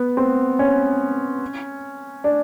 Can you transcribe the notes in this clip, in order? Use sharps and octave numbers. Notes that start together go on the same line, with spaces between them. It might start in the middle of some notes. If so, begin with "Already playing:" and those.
Already playing: B3
C4
C#4
D4